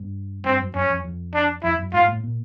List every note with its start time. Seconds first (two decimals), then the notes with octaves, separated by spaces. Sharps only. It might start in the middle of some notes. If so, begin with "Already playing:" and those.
Already playing: G2
0.44 G2 C4
0.60 F#2
0.75 F#2 C#4
0.90 F2
1.04 F2
1.34 D4
1.63 F2 E4
1.79 F#2
1.93 G#2 F4
2.08 A2
2.24 A#2